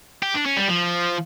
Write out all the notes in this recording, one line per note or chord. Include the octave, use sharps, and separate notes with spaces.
G4
D4
C#4
G3
F3